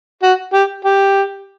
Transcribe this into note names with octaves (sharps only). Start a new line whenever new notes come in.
F#4
G4
G4